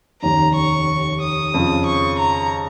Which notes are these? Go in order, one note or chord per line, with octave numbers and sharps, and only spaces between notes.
F1 D#2 D#3 C#4 A#5
C#6
D#6
F2 C#3 F3
C#6
A#5